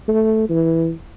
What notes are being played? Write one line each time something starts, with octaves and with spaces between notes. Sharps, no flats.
A3
E3